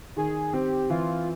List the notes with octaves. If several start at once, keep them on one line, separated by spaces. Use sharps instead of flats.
D#3 G#4
C4 G4
E3 F4